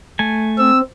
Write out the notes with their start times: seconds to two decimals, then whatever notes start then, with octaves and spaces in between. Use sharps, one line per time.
0.19 A3 G#5
0.59 C4 E6